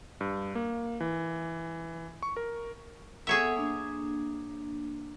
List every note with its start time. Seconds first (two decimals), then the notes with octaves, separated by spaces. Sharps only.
0.21 G2
0.55 A#3
1.00 E3
2.23 C#6
2.37 A#4
3.27 B3 G#4 A4 C#5 E5 F#5
3.56 A#3 D4